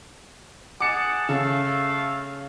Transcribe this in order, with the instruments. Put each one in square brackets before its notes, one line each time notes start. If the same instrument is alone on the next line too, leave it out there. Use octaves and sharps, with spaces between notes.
[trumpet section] G#4 F#5 A5 [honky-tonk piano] D6 C#7
[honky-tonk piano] C#3 [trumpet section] A3 A4 F5